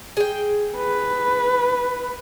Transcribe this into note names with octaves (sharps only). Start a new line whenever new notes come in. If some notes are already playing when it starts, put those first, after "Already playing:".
G#4 G5
B4